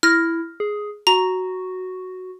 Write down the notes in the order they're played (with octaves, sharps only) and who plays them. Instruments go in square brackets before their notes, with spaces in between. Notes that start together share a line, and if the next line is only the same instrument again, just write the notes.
[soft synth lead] E4 [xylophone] F6 A#6
[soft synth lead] G#4
[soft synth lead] F#4 [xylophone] A#5